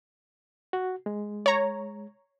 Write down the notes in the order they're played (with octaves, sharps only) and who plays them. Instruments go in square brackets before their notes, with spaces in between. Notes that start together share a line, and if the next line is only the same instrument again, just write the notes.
[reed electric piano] F#4
G#3
[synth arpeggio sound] C#5 A#5